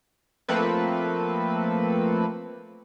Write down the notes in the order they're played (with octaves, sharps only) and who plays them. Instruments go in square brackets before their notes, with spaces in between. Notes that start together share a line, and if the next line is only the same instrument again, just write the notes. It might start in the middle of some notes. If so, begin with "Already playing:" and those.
[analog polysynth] F3 A3 A#3 C4 A4 B4